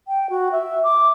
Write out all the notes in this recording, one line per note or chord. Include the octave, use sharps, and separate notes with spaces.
G5
F#4
E5
D6